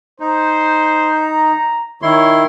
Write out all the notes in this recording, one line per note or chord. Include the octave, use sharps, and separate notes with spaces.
D#4 C5
A#5
D#3 E4 C#5 C6